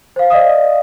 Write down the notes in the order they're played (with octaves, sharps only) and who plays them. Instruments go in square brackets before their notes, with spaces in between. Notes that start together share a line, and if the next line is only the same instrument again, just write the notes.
[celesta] C5 F5
D5 D#5 F5 D#6